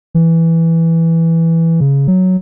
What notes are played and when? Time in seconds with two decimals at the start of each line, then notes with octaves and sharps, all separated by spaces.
0.14 E3
1.80 C#3
2.07 F#3